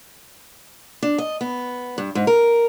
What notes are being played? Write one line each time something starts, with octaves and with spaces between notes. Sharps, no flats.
D4
D#5
B3
G2
G#2
A#4